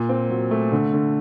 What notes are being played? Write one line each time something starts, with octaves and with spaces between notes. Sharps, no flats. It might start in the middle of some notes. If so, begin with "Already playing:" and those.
Already playing: A#2
C4
F#3
A3
D3
D3